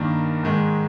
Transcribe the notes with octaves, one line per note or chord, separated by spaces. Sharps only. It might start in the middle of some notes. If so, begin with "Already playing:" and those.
Already playing: G2 D#3 A#3 D5
G#2 D#3 G#3